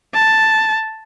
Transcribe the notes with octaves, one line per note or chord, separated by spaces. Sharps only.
A5